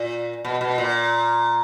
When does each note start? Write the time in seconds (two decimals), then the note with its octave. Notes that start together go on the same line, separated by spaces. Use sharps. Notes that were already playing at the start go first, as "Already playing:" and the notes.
Already playing: A#2
0.45 B2
0.61 B2
0.78 A#2